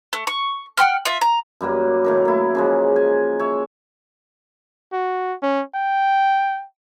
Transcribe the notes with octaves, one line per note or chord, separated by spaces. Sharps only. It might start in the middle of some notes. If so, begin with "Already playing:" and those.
A3
C#6
F#5 G5 C6 F6
F4 E5
A#5
F#2 G3 A#3 B4
A2 D#3 A#4
A#3 E4
C#3 F3 G#3
G#5
C#5 E5
F#4
C#4
G5